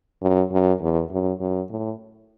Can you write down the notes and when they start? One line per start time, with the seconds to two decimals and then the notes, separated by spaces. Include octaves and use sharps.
0.22 F#2
0.52 F#2
0.81 E2
1.11 F#2
1.40 F#2
1.70 A2